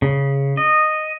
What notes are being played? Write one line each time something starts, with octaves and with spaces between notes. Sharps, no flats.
C#3
D#5